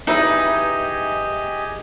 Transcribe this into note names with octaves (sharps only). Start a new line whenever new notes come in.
D#4 E4 G4 G#4 B4 D#5 E5 B5